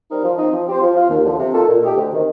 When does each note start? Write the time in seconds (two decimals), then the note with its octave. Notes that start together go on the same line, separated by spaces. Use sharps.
0.09 G3 C4 D#4 A#4
0.23 F3
0.38 C4 D#4
0.52 F3
0.66 C4 G4 C5
0.81 F3
0.96 C4 F4
1.10 D#2
1.25 D3 F3
1.39 C3
1.53 D#3 A#3 F4 A4
1.69 A#2
1.83 A3 D#4 G4
1.97 D2
2.12 C3 D#3